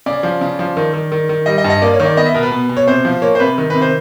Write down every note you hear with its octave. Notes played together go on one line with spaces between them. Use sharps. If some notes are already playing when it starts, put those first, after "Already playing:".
C#3 D5
F3
C#3
F3
D#3
D#3
D#3
D#3
G3 D#5
D#5
G2
D#5
A#3 D5
C#5
D#3
D5
B3 D#5
E5
B2 A#4
B4
B2
B2
C#5
C3 C5
F3
A#3 C#5
C5
C3 B4
D#3
C3 B4
C5